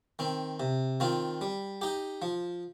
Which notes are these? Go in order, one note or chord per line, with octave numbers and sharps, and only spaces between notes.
D#3 C4
C3
D#3 C4 F4
G3
D#4 G4
F3